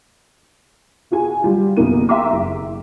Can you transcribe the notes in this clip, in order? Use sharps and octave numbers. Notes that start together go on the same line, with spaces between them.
F4 F#4 G#4 G#5
F#3 G3 F4
F#1 F#2 B2 D#3 A#3 D#7
E5 G5 A#5 C6 D6
F#1